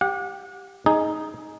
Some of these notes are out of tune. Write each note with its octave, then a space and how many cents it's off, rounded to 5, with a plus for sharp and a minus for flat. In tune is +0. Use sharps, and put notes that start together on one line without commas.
G4 +0 F#5 -35
D#4 +5 G#4 +10